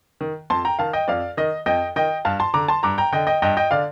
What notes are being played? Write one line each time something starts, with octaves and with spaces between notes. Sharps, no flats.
D#3
F2 A5 C6
G5 A#5
D#3 F5 A5
D#5 G5
F2 D5 F5
D#3 D#5
F2 D#5 G5
D#3 D#5 G5
G2 F5 A5
A5 C6
D3 A#5 D6
A5 C6
G2 A#5 D6
G5 A#5
D3 D#5 G5
D#5 G5
G2 D#5 G5
D#5 G5
D3 D5 F5